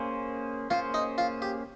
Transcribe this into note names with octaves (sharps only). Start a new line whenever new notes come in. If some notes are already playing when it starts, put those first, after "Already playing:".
Already playing: A#3 C#4 G#4 C5
A#3 C#4 F4 G#4 C5
D#4
F4
G4